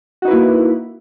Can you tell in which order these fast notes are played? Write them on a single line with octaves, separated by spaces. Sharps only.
F#4 D#4 B4 E4 A#3